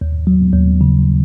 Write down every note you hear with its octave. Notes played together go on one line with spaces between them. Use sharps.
D#2
F#3
D#2
C#3